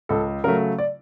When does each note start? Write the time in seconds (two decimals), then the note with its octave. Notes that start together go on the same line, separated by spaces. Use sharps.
0.09 C#2 A4
0.44 C#3 F#3 A3 A#4
0.78 D5